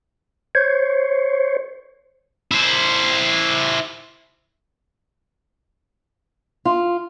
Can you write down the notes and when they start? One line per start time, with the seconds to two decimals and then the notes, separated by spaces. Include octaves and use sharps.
0.55 C5 C#5
2.51 E4 C5
6.65 F4